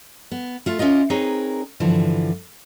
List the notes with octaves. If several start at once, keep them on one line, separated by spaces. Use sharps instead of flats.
B3
A3 F4
C#4 E4 F4 D#5
C4 D#4 G#4 A#4 B4 C#5
G2 D3 E3 F3